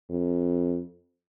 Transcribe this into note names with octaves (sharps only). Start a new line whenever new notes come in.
F2